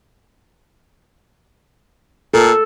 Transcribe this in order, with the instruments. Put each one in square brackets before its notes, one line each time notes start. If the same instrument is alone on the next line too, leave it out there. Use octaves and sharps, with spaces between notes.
[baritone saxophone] A#2 [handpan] A4